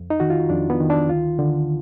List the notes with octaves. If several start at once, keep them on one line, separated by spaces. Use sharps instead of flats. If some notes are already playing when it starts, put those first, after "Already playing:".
Already playing: F2
D#4
D#3 F#4
F4
F2 D4
B3
D#3
D4
D2 F4
D3